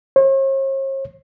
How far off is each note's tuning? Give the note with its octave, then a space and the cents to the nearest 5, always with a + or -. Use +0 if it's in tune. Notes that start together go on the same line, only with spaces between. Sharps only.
C#5 -45